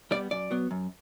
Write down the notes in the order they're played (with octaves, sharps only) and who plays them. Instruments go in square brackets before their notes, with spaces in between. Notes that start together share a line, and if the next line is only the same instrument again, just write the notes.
[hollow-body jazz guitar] G3 B3 D5
F#2 D5
F#3 B3
F#2